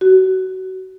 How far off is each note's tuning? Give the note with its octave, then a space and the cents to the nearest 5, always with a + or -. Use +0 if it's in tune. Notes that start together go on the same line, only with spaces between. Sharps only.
F#4 +25